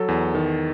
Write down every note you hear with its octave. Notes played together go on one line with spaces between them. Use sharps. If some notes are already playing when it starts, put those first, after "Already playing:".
Already playing: F#3 A4
E2
D#3